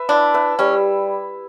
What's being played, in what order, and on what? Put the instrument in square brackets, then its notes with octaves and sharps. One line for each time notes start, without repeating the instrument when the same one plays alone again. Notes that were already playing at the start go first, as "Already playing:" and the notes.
Already playing: [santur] B4 E5
[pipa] D4 [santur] E4
[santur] B4 E5
[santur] G3 [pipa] C#4